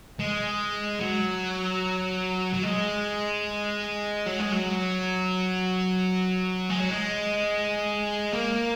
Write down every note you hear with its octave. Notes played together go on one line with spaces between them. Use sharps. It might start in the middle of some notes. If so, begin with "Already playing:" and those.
G#3
F#3
F#3
G#3
F#3
G#3
F#3
G#3
F#3
G#3
A#3